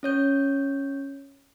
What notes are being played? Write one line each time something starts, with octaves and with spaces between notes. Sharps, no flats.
C#4 C#5 G6